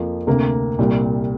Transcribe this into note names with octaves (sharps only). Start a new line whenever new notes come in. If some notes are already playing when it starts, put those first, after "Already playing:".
Already playing: F2 F3 A#3
D2 C3 A#3
C2 A#2 G3